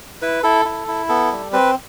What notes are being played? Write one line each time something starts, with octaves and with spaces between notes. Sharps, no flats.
E4 B4
E4 A4
E4
E4
B3 A4
G3
C4 B4